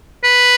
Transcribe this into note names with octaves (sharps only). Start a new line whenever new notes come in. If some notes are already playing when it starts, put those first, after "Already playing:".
B4